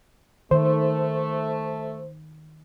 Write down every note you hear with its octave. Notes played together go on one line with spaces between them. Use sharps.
D#3 A3 C5